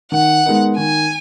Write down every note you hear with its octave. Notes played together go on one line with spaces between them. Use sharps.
D#3 F#5
G#3 B3 D#4 A#4
D#3 G#5